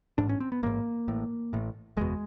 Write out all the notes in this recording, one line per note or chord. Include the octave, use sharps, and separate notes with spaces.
A1 G#2 D4
C#4
C4
B3
A1 G#2 A#3
A1 A2
A1 A2
F#1 E2 B2 G#3